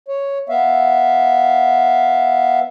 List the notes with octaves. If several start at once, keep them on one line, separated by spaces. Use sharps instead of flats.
C#5
B3 E5 F5